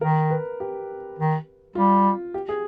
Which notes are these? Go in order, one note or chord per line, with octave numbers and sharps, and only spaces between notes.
D#3 A#4
B4
G4
D#3
G3 F4
G4
G#4